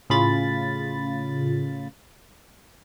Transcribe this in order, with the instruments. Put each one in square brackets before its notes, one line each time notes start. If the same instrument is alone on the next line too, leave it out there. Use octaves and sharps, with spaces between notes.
[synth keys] A2 C#3 F4 B5 A6